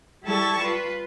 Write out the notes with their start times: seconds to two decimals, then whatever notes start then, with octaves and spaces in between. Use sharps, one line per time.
0.24 G3 E4 A4 A5 C#6
0.61 F4 B4